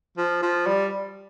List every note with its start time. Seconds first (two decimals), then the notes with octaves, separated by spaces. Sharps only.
0.18 F3
0.42 F3
0.67 G3